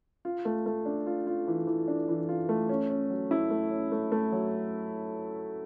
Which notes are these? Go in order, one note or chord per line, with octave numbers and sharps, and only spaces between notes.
F4
A3
A3
D4
F4
F4
E3
E3
D4
E3
F4
A3
C#4
C#4
F#3
E4
A3
C#4
A3
A3
F#3